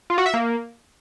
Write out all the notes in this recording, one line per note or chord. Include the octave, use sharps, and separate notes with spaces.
F4
F#4
E5
A#3